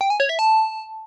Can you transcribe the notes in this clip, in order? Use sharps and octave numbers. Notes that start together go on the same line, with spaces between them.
G5
G#5
C#5
E5
A5